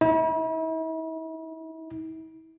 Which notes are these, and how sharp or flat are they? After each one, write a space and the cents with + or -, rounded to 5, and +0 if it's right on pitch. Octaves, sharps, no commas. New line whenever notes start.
E4 -40